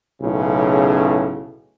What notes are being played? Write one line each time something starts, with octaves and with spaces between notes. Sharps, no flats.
B1 A2 C#3